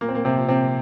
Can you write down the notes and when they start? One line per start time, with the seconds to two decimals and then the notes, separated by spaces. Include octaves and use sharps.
0.01 A#2 A#3
0.09 C4
0.15 A#3
0.25 C3 C4
0.37 F3
0.48 C3 C4